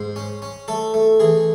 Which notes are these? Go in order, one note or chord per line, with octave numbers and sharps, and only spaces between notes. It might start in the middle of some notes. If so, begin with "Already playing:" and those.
Already playing: G#2 C5
C#4
C#4
A3 A4
A3
E3 G#4